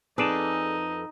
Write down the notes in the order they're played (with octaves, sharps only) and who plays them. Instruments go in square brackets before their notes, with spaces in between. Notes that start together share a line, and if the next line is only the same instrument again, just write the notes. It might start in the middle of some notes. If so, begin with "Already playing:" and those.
[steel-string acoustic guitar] F2 A4 B4 [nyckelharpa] D#4 [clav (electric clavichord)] G#4 D5 A5